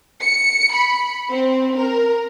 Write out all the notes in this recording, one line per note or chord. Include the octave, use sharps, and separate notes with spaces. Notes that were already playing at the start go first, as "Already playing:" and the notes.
C#7
B5
C4
A#4